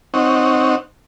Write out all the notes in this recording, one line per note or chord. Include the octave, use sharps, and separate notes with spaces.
C4 D#4 C#5 F#5